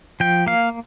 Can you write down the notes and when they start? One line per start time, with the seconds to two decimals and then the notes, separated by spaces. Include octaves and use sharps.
0.20 F3 G5
0.47 A#3 F5